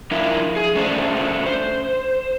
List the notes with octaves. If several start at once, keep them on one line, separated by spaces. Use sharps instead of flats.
F3 D4 E4 F4 A#4 E5
G#4
A3 C#4 D4 C5
C5